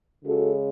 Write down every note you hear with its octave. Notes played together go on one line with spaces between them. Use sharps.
C#3 G#3 C#4 F#4 A4